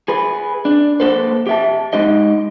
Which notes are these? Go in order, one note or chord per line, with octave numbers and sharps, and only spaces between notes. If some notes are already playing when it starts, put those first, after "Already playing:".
G#4 B4
D4
A#3 A4 B4 C5
G4 E5 A5
G#3 D#4 G4 D#5